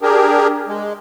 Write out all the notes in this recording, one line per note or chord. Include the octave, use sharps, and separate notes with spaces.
D4 G4 G#4 A#4
G#3